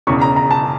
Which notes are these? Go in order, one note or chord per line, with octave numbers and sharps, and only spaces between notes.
E1 E2 C#3 C#6
A#5
A#5
A5